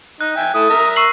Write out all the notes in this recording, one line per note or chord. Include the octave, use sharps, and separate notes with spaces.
D#4 F#6
E5 G5 G#5
A3 E4 D#6
A#4 E5 A#5
C#6 E6 C7 F#7